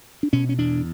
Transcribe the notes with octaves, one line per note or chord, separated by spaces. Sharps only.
D4
B2 C#4
C#4
E2 D4